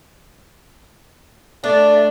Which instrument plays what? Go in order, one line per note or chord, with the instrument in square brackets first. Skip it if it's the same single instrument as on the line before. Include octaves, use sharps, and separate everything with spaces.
[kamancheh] A3 [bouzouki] D4 [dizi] D5